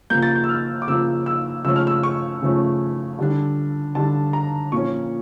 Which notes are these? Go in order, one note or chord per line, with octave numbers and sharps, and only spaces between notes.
C#3 F3 A#3 G6
A6
G6
E6
F6
D6
C#3 F3 A#3 E6
E6
C#3 F3 A3 C#4 E6
F6
E6
C#6
C#3 F3 A3 C#4
D3 G3 D4
D3 G3 D4 A5
A#5
A#2 F3 A#3 C#4 C#6